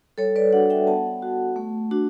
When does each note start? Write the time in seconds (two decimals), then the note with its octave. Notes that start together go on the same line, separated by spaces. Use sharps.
0.18 G3 A4 C#5
0.36 B4 D5
0.53 D4 F#4 D5 F#5
0.70 E5 G5
0.87 B3 F#5 A5
1.23 F#4
1.56 A3
1.91 D4 F#4